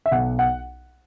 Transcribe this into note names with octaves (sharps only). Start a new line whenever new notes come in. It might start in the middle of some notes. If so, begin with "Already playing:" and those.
E5
B1 F#5
F#5